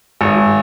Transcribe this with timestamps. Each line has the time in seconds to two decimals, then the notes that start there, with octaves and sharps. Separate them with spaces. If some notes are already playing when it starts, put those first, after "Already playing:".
0.21 G#1